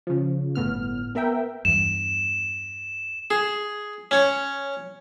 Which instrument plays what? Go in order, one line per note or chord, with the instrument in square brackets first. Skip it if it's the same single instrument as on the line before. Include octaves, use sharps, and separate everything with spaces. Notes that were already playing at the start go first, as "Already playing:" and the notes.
[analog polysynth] C#3 F3
G1 A2 B3 F6
B3 A#4 E5 G5
[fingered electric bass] E2 G2 [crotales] E7
[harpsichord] G#4
C#4 C#5